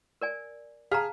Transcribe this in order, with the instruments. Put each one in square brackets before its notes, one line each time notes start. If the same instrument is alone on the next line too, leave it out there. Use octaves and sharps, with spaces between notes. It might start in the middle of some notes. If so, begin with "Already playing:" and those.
[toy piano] A#4 D5 G#5
[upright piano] G#4 F6 [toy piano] F5 A5 A#5